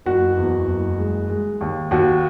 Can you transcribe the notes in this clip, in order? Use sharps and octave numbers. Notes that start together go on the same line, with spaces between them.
F#1 F#4
E2
F#1
G#3
G#3
D#2
D#2 F#4